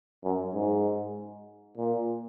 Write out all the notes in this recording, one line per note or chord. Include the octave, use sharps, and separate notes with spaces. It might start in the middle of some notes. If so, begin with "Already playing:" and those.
F#2
G#2
A#2